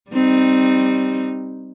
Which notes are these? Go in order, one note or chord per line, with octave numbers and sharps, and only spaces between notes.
G3 C4 D#4